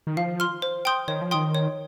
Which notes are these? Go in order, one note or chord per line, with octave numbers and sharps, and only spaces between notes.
D#3
F3 F5
C6 F6
C5
G5 C6 D#6 G6
D#3 C#5
F3
D#3 G5 C6 D#6
C#5